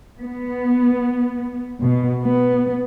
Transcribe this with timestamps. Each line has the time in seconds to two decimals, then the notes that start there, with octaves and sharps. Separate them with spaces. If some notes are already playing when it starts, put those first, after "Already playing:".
0.20 B3
1.82 B2
2.24 B3